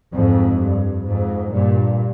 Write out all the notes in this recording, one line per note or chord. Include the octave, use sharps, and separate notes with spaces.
F2 G#2
G2
F2 G#2
G2 A#2